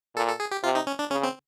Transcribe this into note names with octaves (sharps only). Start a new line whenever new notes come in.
A#2 A4
A4
G#4
G4
C3 F4
D#4
C#4
D4
C#3 C#4
C4